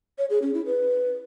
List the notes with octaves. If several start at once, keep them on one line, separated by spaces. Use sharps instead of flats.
C#5
G#4
C#4
E4
B4